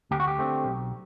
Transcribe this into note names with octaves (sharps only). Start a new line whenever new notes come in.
D2 G4
F#4
G4
D3 A3 C4
B1